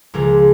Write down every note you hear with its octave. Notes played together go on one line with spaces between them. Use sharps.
C#2 C#3 F3 A#4